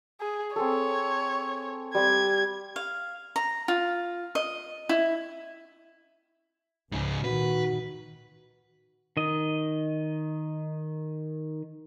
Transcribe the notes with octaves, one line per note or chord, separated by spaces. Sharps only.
G#4
C4 G#4 A4 C#5
G3 C4 G#6
F5
A#5
F4
D#5
E4
C#2 G#2 C#3
A#2 D#3 F#4 B4
D#3 D#5